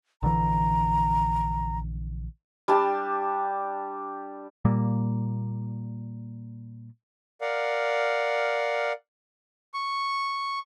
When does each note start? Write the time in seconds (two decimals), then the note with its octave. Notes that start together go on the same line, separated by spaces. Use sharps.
0.23 A#1 D3 E3 A#5
2.68 G3 D4 G4 A5
4.65 A#2 G3 A#3
7.41 A#4 D5 F5 F#5
9.74 C#6